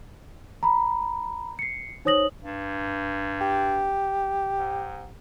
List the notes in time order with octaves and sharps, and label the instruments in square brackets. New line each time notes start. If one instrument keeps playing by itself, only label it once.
[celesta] A#5 B5
C7 C#7
D#4 C5 C#5 D#6 A#6 F#7
[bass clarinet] G2
[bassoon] G4
[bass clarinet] G#2